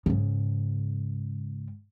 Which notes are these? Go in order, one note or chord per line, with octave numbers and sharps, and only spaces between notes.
G#2 C#3